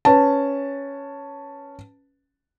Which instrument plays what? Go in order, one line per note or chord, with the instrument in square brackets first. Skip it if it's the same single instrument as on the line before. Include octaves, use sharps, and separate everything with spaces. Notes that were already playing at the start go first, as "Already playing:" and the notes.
[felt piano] C#4 B4 A5